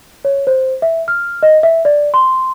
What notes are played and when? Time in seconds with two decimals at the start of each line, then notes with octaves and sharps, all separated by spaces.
0.25 C#5
0.47 C5
0.82 E5
1.08 F6
1.43 D#5
1.63 E5
1.85 D5
2.14 C6